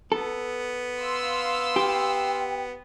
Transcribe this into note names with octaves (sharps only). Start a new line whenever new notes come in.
B3 A4
F5 C6 E6
G4 G5